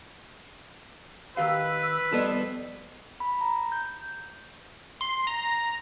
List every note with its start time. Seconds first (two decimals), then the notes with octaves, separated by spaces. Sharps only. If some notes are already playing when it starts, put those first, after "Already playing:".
1.37 D#3 G4 B4 F5 E6
2.13 F3 G3 B3 A4 D#5
3.20 B5
3.41 A#5
3.72 G6
5.01 C6
5.27 A#5